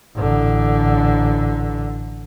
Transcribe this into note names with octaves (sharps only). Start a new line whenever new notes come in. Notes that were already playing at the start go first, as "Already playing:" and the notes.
A1 D3